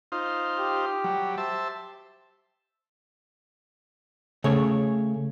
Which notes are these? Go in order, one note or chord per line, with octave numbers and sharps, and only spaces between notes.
D#4 F4 C5
G4
F#3 G3
C5 E5 A5
C#3 A3 C#5